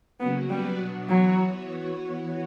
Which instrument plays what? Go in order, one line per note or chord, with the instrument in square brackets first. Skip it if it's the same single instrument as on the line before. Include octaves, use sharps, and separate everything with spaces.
[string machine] C#3 F#3 A#3 C#4 F#4 [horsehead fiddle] B3
[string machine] F#3 B3 F#4 B4 D5 [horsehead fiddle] G3
[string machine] B2 F#3 B3 D4
[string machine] E3 B3 F#4 C#5 [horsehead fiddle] F#3